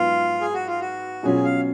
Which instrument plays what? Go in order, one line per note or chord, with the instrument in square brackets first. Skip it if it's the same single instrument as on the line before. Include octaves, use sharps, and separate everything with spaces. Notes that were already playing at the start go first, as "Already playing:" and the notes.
Already playing: [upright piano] G#2 F#3 B3 [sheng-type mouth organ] F4
[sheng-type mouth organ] G#4
F#4
F4
F#4
[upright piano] B2 F#3 C#4 F4 [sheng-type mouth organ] G#4
[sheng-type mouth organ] F5